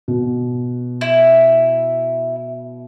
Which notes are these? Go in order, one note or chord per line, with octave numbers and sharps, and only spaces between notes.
B2
E4